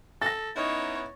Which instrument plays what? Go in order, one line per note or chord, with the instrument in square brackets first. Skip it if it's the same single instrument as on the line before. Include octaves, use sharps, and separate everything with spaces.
[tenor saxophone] A4 [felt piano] A6 A#6
[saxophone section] B3 C#4 D#4 [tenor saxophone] E4 [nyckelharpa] C#5